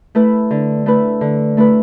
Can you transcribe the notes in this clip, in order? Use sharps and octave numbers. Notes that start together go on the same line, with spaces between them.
A3 E4 B4
D3
A3 E4 B4
D3
A3 E4 B4